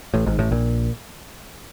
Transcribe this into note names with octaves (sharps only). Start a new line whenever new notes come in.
A1 A2
G#1 G#2
A1 A2
A#1 A#2